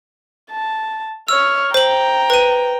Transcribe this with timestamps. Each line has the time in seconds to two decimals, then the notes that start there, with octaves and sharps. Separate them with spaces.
0.51 A5
1.28 C#5 E6 F6
1.74 C5 G5 A#5 F#7
2.30 B4 D#7